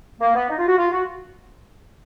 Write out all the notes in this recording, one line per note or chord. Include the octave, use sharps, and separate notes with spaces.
A#3
B3
D#4
F4
F#4
F4
F#4